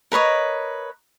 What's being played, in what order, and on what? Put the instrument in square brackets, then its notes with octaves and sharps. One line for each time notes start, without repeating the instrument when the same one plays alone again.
[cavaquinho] A#4 B4 C#5 D#5